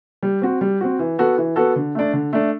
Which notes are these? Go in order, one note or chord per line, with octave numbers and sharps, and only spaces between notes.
G3
C4 F#4
G3
C4 F#4
E3
B3 F#4 A4
E3
B3 F#4 A4
D3
A3 D4
D3
A3 D4